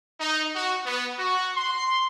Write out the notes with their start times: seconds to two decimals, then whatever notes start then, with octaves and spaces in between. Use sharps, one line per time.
0.20 D#4
0.55 F#4
0.86 B3
1.19 F#4
1.57 C6